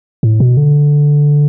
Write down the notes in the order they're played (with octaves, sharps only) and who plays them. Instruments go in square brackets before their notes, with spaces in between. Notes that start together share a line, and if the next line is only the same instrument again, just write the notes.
[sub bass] A2
B2
D3